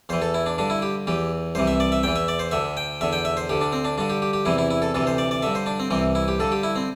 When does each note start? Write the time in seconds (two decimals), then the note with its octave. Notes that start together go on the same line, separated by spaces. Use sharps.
0.09 E2 E3 C5
0.22 A4
0.34 E4
0.46 D4
0.58 G2 D3 D4
0.70 E4
0.82 G4
1.07 E2 E3 G4
1.55 C2 C3 E3 C5
1.67 E5
1.80 D5
1.92 E5
2.03 E2 E3 G5
2.16 E5
2.28 D5
2.39 C5
2.51 D2 D3 E5
2.77 G5
3.01 E2 D3 E5
3.13 G5
3.25 E5
3.37 C5
3.50 D2 D3 G4
3.61 D4
3.73 C4
3.85 D4
3.98 G2 D3 D4
4.10 G4
4.22 G4
4.33 G4
4.45 E2 C3 E3 E4
4.58 E4
4.70 E4
4.82 A4
4.94 D2 C3 E3 A4
5.07 C5
5.18 D5
5.31 D5
5.43 G2 D3 E5
5.55 C5
5.66 D4
5.80 C4
5.90 C2 C3 E3 C4
6.15 E4
6.28 G4
6.40 G2 D3 A4
6.52 G4
6.63 E4
6.76 C4